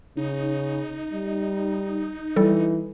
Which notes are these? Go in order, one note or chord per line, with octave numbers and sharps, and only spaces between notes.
C#3 D#4
G3
E3 G3 A4